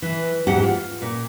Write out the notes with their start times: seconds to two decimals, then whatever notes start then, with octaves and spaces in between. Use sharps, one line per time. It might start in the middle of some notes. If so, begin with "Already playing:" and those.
0.02 E3
0.47 E2 G#2 G4 F#5
0.63 F4
1.02 A#2